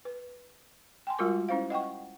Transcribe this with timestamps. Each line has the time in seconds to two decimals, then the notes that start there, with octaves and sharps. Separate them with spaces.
0.05 B4
1.07 G5 G#5 C6
1.19 G3 G#3 F4 F#4 A#4 D6
1.49 C#4 E4 C5 F5
1.70 D#5 F#5 G5 C#6